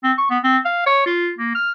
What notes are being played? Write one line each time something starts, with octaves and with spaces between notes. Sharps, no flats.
C4
C#6
B3
C4
F5
C#5
F4
A#3
F6